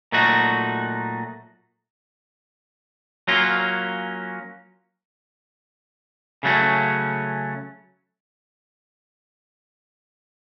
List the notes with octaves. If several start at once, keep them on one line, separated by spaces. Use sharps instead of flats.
A#2 F#3 A3 D#4 F#4
F#3 A#3 C#4 F4
C#3 F#3 A3 C#4